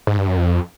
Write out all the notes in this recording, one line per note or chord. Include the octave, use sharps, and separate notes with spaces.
G#2
G2
F#2
F2